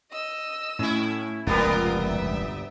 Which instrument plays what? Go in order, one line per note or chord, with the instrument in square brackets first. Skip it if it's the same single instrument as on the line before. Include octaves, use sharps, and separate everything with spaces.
[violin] D#5 E6
[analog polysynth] A2 [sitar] C#4 E4
[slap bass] F1 C#2 [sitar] A#2 G3 B3 [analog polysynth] F4 [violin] A#4
[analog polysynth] G1 [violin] E5